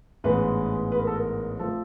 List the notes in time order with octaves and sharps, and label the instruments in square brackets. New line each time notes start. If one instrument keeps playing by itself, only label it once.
[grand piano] A1 G#2 E3 G#3 B3 B4
B4
A#4
A4
A#4
F3 A3 C4 A4